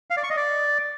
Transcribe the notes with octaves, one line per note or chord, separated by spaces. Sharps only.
F5
D5
C#6
D#5
D5